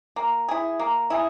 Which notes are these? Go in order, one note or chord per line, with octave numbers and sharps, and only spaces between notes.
A#3
E4 G#4
A#3
E4 G#4